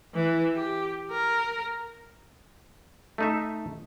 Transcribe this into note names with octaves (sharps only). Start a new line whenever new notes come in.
E3
G4
A#4
A3 D#4 E5